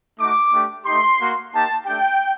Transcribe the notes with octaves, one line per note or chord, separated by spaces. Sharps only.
A3 D#4 F#4 D6
A3 D4 G4
A3 D#4 G4 C6
A#3 F#4
A#3 D#4 G4 A5
A3 D4 G4 G5